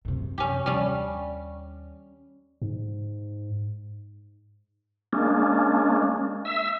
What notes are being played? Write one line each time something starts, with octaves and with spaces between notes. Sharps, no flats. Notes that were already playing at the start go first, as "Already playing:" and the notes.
F#2 C3
C#4 G4
D#2 G3 C#4
G#2
G#3 A#3 C#4 D4
E5 E6